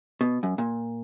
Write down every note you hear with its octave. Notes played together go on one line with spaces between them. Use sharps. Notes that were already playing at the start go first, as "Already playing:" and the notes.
B2
F#2
A#2